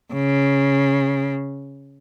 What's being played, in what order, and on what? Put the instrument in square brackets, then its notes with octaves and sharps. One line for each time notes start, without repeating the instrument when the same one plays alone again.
[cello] C#3